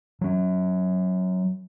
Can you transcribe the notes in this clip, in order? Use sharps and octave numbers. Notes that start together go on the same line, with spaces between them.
F#3 C#4